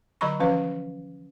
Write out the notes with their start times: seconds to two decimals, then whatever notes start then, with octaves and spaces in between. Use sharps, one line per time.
0.21 D3 F#3 D#5 A#5 B5 C#6
0.39 E3 F3 C#4 B4 F5